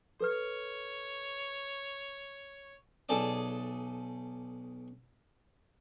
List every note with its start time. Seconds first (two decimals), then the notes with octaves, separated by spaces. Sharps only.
0.21 A4 B4 C#5 F6
3.09 B1 G#4 A4 D5 D6